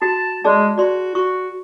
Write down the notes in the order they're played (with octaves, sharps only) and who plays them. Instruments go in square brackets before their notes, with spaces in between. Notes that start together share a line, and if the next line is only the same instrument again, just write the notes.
[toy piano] F#4 [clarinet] A5
[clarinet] G#3 [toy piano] G#4 D5 A5
[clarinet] F#4 [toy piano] D5 C6
[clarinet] F#4 [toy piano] C#6